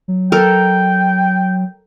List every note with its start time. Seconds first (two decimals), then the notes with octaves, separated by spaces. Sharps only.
0.08 F#3
0.32 A4 A#4 G5